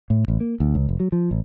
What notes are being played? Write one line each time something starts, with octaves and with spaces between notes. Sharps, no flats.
A2
A1
A#3
D2
C#2
F1
F#3
F3
A1